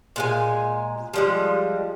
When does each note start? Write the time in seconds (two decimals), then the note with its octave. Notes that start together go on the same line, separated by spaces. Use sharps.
0.16 A#2 G#3 G#5
1.14 F3 G3 G#3